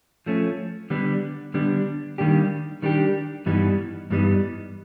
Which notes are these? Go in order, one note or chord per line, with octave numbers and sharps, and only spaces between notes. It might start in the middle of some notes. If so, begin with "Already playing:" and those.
F3 A3 C#4
D3 G3 B3 D4
D3 G3 B3 D4
D#3 G3 A#3 D4 G4
D#3 G3 A#3 D4 G4
G2 E3 G3 B3 D#4
G2 E3 G3 B3 D#4